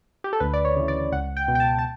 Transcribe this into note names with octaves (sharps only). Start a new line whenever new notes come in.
G4
A4
D2 B4
D5
C#5
C#3 E3
D5
C#2 F#5
G5
B2
G5
A5
A5